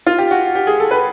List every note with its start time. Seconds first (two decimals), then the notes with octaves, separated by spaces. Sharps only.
0.06 F4
0.18 G4
0.31 F#4
0.55 G4
0.67 G#4
0.80 A4
0.91 B4